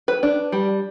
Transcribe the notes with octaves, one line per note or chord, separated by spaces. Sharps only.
B4
D4
G3